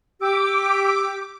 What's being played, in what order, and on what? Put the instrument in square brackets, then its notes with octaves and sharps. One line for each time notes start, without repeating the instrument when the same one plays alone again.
[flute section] G4 E6 [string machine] D6